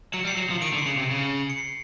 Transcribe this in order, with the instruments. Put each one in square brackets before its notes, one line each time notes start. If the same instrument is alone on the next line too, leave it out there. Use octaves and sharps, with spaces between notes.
[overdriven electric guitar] F#3 [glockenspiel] C#7
[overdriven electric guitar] G3
[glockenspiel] C7
[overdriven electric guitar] F#3 [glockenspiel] C#7
[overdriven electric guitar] F3
[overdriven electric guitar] D#3 [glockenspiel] D7
[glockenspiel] C#7
[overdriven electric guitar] D3
[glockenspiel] C7
[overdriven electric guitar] C#3 [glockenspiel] C#7
[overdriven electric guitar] C3
C#3
[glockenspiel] C#7
C7